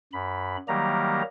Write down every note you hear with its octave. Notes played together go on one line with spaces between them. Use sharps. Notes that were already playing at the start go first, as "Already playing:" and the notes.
F#2 B5
D#3 F#3 G3 A#3 G4 A#5